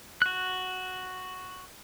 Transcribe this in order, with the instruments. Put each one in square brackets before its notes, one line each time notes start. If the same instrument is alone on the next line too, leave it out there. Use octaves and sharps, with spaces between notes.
[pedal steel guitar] F#4 F#6